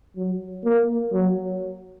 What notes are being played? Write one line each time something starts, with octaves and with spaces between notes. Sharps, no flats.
F#3
A#3
F#3